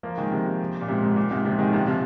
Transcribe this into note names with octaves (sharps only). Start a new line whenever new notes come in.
F3 A#3
D#3 G#3
C3 F3
A#2
G#2 C3
G#2
A#2
G#2 C3
C3 F3
D#3 G#3
C3 F3
C3 F3